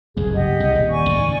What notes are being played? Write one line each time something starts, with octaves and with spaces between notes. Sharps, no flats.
F#1 C2 G2 G#4
G4 D#5 F#5
C2
D#1
D5 G#5 C#6
G#1 C#3